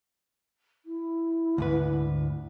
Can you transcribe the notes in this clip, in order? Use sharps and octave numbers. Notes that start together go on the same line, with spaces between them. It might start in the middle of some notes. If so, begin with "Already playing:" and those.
E4
D2 G#2 B4